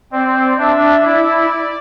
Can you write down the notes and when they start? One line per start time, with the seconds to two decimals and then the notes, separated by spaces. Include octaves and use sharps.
0.12 C4 D5
0.58 D4 E5
1.05 E4 D5